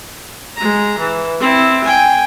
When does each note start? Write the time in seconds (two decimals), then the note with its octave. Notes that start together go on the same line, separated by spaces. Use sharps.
0.57 G#3 A#5
0.99 E3
1.40 C4 E4
1.85 G5 G#5